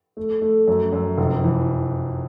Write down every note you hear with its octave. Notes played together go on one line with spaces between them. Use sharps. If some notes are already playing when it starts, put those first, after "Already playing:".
A3
A3
F#2
F#2
F1
E3